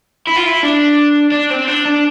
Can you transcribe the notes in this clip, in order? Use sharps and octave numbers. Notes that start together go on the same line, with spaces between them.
E4
F4
E4
D4
D4
C4
D4
D4